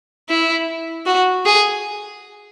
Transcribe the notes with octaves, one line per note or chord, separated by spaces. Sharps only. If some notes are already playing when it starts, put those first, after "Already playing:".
E4
F#4
G#4